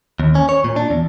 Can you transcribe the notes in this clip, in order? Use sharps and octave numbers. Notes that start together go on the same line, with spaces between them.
D#2
C#4
C#5
A#2
D4
E2